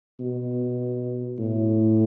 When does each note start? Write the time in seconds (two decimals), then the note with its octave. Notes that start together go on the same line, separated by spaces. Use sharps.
0.20 B2
1.39 A2